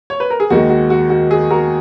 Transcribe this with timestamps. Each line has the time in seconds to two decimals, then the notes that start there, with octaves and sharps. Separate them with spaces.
0.10 C#5
0.20 B4
0.30 A#4
0.40 G#4
0.50 D#2 D#3 G#3 F#4
0.70 F#4
0.90 F#4
1.10 F#4
1.31 G#4
1.51 F#4 A#4